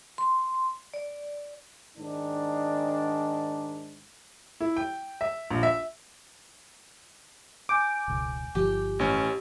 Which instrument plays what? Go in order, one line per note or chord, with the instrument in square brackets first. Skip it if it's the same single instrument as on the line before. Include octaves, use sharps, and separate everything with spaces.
[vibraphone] C6
D5
[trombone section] G#2 D#3 D4
[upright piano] E4
G5
E5
A#1
E5
[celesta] G#5 G6 D7 [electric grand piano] D6
[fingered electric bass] E1 C#2
[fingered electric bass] G1 F3 [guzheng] G4
[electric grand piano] A1 C#4